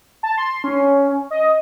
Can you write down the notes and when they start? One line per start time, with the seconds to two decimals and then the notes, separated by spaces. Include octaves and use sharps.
0.23 A5
0.38 C6
0.64 C#4
1.31 D#5